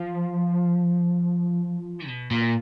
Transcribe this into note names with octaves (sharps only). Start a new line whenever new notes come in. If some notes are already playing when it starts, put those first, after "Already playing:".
Already playing: F3
B2
A#2